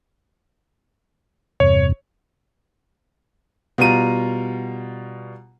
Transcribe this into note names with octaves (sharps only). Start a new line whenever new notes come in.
E2 G2 C3 C#5
B2 G3 F4 A#5 D#7